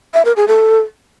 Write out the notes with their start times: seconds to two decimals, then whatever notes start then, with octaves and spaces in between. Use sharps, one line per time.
0.14 E5
0.25 A#4
0.36 G#4
0.48 A4